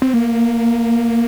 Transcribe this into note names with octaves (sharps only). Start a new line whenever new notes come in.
C4
A#3